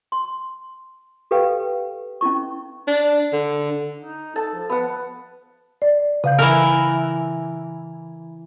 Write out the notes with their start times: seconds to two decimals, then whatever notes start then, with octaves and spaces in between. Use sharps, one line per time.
0.12 C6
1.31 G4 A4 B4 F5 G5
2.21 C#4 D#4 E4 C#6
2.88 D4
3.33 D3
4.01 D#4
4.36 A4 A5
4.55 F3
4.69 B3 F#5
5.82 D5
6.24 C#3 F5 G6
6.39 E3 A#4